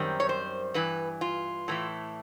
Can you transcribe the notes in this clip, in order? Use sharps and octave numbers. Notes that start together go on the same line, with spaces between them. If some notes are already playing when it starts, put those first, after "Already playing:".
Already playing: F#2 D#3 G3 C4
C#5
C5
G2 E3 B4
F4
A2 E3 A3